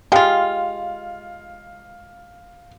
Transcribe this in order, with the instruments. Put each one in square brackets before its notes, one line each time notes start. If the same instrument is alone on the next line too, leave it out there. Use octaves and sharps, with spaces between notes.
[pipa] G#3 F4 [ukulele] G4 [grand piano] F5